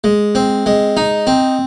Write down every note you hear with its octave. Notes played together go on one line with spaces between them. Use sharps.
G#3
C4
G#3
D#4
C4